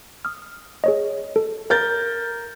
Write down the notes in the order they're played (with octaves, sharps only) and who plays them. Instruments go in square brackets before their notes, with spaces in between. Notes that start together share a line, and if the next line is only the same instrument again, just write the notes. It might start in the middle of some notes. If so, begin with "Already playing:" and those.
[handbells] D#6 F6
G#4 C#5 D#5
A4
[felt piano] A#4 G6 A6